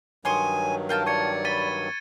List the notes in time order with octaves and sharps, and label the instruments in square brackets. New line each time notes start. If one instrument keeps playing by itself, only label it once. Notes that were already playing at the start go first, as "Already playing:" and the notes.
[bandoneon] G2 D#3 F#3 [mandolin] C#5 C6 D#6 [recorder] G#5
[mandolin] F4 G5 A5 [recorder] A#4
[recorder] D5 [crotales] C#6 G#6 C#7
[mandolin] B5 [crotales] A6 D#7 G7